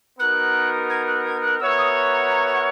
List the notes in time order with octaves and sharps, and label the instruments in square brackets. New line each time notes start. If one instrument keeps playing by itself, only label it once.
[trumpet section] B3 D#4 F#4 A#4 [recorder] F#6
[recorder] G#6
F#6
G#6
F#6
[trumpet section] B3 F#4 A#4 C#5 E5 [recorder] E6
[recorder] D#6
C#6
A#5
A#5
F#5